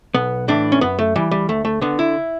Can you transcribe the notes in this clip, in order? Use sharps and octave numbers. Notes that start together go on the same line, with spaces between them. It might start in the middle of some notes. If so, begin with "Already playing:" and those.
B1 B3
A2 E3 D4
C#4
F#2 B3
A3
E3 G3
G3
D2 A3
A3
D3 B3
E4